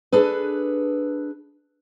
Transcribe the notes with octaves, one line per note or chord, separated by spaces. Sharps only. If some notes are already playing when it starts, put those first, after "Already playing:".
D4 G#4 A4 B4